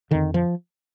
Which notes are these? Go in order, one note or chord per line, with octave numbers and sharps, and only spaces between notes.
F2 D3 D#3
F3